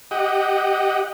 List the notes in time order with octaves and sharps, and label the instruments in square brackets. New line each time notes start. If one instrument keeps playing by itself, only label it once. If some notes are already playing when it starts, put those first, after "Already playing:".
[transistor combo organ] G4 D#5 F#5